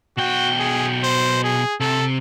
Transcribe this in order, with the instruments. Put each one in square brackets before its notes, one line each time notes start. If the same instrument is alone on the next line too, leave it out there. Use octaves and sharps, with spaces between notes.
[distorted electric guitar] B1 G5 [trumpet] F#4
[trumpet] G#4
C5
G#4
[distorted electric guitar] C3 [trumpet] A4